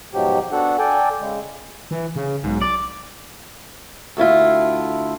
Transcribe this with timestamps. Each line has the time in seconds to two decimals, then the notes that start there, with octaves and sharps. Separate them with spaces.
0.14 G#2 B2 F3 F#3 G4
0.52 B3 D4 F#4 A4 F#5
0.79 A4 D5 G5 G#5
1.20 C#3 G#3
1.91 E3
2.16 C#3
2.44 B1 G#2
2.62 D5
4.17 D2 A3 E4 F4